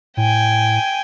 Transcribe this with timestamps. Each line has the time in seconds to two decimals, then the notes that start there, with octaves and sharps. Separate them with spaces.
0.17 A2 G5 G#5